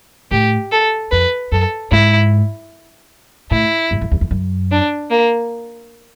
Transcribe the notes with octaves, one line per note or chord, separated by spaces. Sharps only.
A2 G4
A4
F2 B4
F#2 A4
G#2 E4
A2 E4
G2
F2
E2
F2
F#2
D4
A#3